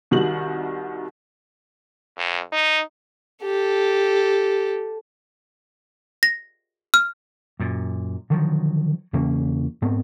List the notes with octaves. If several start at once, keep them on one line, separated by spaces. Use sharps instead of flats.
C2 D#3 G3 F#4 F#7
F2
D#4
G4 A4
A#6
F6
F#2 A#2
D3 D#3 F3 F#3
E2 C#3 A#3 C#4
G#2 B3 C4